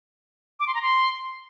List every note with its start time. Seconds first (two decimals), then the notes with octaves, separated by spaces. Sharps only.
0.60 D6
0.67 C6
0.74 A#5
0.82 C6